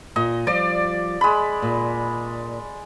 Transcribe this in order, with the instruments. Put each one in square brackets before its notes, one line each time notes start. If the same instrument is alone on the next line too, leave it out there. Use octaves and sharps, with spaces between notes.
[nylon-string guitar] A#2 [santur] D#5
[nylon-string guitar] F3 G3 [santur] D5
[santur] G#3 B5
[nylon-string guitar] A#2